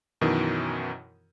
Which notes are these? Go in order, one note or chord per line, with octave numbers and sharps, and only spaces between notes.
F#2 B2 D#3 E3